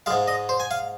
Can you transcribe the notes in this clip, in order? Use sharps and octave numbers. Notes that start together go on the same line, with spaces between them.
G#2 G#3 F5
D#5
C5
G#5
F5